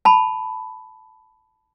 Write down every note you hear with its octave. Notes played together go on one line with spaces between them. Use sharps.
A5 B5